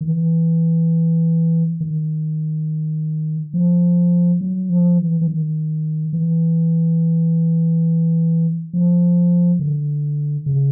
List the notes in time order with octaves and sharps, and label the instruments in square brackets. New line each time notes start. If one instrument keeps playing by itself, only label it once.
[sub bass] D#3
E3
D#3
F3
F#3
F3
E3
E3
D#3
E3
F3
D3
C#3